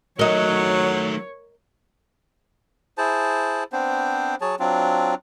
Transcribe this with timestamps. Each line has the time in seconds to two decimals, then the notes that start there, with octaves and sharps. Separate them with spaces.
0.19 D#3 F#3 A3 A#4 C#5 D#5
2.98 E4 G#4 C5 A5
3.72 B3 C4 D4 C5
4.41 F#3 G#4 C#5 A5
4.60 F#3 C4 D4 F4